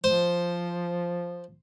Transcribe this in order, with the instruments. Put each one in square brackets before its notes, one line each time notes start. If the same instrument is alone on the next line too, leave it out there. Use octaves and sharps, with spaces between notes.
[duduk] F3 [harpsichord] C5